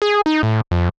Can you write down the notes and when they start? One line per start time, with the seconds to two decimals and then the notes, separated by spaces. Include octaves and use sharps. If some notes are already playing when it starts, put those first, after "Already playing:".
0.02 G#4
0.26 D#4
0.43 A2
0.71 F2